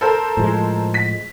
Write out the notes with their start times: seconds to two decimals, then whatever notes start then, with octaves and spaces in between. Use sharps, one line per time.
0.01 A4 A#4 C5
0.37 A2 F3 G#3
0.94 B6